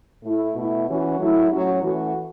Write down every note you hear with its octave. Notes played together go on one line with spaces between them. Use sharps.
A2 A3 E4
B2 A3 E4
E3 C#4 F#4
F#3 A3 E4
A2 F#3 C#4 F#4
E3 A3 C#4 F#4